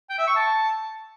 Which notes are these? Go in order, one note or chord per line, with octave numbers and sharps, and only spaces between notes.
G5
E5
C#6
A5